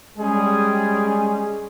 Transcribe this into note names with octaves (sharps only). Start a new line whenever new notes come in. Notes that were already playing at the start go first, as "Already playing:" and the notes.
G3 G#3 C#4 G#4